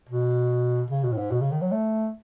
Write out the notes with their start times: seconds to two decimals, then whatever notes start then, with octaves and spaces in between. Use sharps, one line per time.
0.09 B2
0.90 C#3
1.04 B2
1.12 A2
1.18 G#2
1.31 B2
1.41 C#3
1.51 D#3
1.62 F#3
1.72 A3